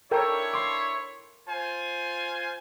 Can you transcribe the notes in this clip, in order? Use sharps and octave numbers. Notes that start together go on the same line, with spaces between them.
D4 E4 A4 A#4 C#5 G5
C6 D6
F4 C5 G#5